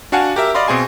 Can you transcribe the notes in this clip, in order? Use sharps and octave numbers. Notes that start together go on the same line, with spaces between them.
D4 F#4 F5 F#5 G#5 A5
G4 A#4 E5
D5 D#5 F5 B5 C6
B2 C4 G#4 G#5 C6